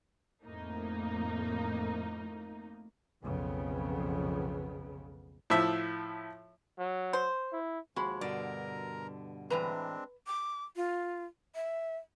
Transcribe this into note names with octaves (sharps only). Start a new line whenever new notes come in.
F2 A2 A#3 D#4
B1 F2 C#3 B3
A2 F3 E5
F#3
C5
E4
D#2 F3 G#3 F#4 B5
G2 B2 D3 A#4 D5 A#5
A2 E3 G#3 C4 D4 B4 A#5
D6
F4
E5